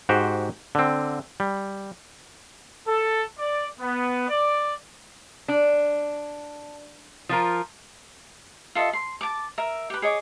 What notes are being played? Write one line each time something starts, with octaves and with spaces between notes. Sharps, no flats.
G#2 F#4 G4 C5
D3 C4
G3
A4
D5
B3
D5
D4
F3 F4 A#4
F4 A4 D#5 E5
C6
A5 D6
A#4 E5
G4 B4
G#4 C#5 D#5 D6